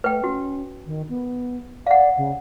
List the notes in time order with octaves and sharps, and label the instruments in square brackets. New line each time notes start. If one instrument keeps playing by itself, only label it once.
[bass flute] A3 [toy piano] B4 G5
[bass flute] C#4 [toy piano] F#4
[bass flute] D#3
B3
[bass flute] D5 [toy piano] F5 F#5
[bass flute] C#3